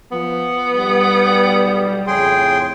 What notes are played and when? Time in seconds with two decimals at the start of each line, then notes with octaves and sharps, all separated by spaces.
0.12 F3 B3
0.76 B1 G3
2.07 F2 A2 C#3 G#4 G5 C6